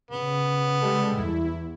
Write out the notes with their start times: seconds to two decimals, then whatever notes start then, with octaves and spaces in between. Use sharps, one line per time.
0.11 C#3 B3
0.81 G3 G#3 A4
1.17 E2 E4